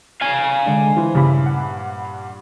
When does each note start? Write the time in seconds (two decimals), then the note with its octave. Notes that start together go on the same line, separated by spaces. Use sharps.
0.22 F5 G#5
0.66 D3 G#3 D4
0.97 E3 C5
1.15 G2 A#2 C#3 E4 B5
1.46 F#5